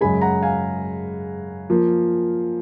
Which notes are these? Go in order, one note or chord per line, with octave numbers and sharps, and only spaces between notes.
F#2 C#3 G#3 G#5 B5
F#5 A#5
F5 G#5
F3 A#3